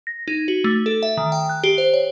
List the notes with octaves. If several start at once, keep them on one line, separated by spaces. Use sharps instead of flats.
A#6
D#4
F#4
A3
A4
E5
D#3
G5
F#6
G4
C5
C#5